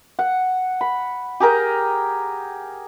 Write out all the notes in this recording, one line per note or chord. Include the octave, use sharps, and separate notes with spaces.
F#5
B5
G4 G#4 A#4 G5